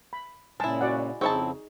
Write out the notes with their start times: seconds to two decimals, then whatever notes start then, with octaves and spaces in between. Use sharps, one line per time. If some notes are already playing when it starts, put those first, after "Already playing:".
0.13 B5
0.60 A#2 C#3 G#3 E4 A5
0.81 F#4 D5 F#5
1.21 F2 C#3 C4 D#4 E4 G#4 A5 C#6